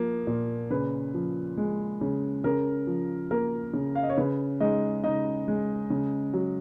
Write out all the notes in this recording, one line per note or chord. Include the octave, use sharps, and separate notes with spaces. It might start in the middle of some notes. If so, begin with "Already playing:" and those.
Already playing: F3 A#3
A#2
C#3 B4
F3
G#3
C#3
C#3 A#4
F3
A#3 A#4
C#3
F5
D#5
C#5
C#3 B4
G#3 D#4 D#5
C#3 D#4 D#5
G#3
C#3
F#3